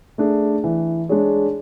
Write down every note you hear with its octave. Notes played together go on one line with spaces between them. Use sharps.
A3 D4 G#4
E3
G#3 D4 G#4 C#5